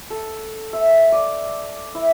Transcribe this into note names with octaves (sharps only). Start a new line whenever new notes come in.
A4
E5
D5
E4